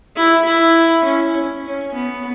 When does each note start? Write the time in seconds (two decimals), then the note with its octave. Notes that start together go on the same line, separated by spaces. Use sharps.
0.16 E4
0.45 E4
1.04 C#4
1.65 C#4
1.94 B3